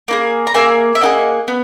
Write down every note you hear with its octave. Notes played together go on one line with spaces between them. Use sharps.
A#3 E4 G#4
A#5
A#3 D#4 G#4 E5 G#5
E5
A#3 D#4 G#4 D#5 F#5
B3